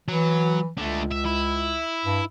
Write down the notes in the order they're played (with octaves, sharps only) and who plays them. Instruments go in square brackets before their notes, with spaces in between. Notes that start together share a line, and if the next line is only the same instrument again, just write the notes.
[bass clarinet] E3 [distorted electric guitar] F#3
[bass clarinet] C#2 [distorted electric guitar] D3 A3
[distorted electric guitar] E5
E4
[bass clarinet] G2